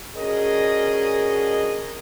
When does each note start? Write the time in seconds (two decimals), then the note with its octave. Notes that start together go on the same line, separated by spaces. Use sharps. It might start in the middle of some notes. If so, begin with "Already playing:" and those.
0.15 C#4 D4 F#4 G#4 A#4 D#5